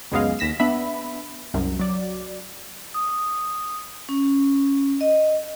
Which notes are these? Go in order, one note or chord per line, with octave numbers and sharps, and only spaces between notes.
C#2 F#2 G#3 B3 D#5 F5
D#2 A#6 B6 E7
B3 D4 E5 B5
C2 F#2
F#3 D5
D#6
C#4
D#5